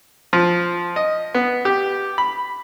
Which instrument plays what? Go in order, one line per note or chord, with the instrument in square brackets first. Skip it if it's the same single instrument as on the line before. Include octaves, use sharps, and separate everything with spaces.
[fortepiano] F3
D#5
B3
G4
B5